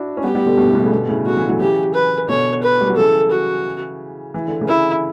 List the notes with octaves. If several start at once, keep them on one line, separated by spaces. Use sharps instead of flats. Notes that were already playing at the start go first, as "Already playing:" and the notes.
Already playing: D4 E4 F#4
C#4
G3 B3 G4
G3 B3
B2 D3
G2 B2
A2
G2 B2
A2 C#3
B2 D3
A2 C#3
B2 D3 F#4
C#3 E3
D3 F#3
C#3 E3 G4
B4
B2 D3 C#5
B4
G3
F#3
C#3 E3 A4
F#4
E3
D3
C#3 E3
E4